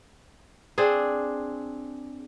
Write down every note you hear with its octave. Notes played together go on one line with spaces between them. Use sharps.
C4 D4 G#4